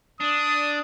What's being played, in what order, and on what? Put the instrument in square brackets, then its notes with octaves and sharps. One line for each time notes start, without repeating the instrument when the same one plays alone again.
[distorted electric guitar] D4 [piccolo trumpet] D#6